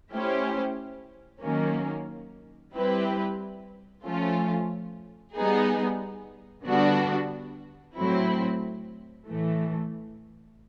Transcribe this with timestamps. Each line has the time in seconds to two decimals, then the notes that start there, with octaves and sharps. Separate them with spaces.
0.11 A3 C#4 E4 G4 C5
1.42 D#3 F#3 A#3 C#4
2.73 G3 C4 E4 G4 B4
4.04 F3 A3 C#4 F4
5.35 G3 B3 D#4 G#4
6.65 D3 G3 B3 D4 F#4
7.97 A2 F#3 A3 C4 E4
9.28 A2 E3 A3